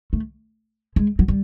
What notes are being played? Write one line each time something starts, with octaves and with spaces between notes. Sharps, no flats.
A3
G#3
F#3
G3